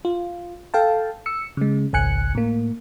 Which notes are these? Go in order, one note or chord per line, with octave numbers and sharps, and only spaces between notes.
F4
A4 F5 G5 A5
E6 C#7
C#3 G#3
G#1 C#2 G#5 F#6 C#7
A2 A#3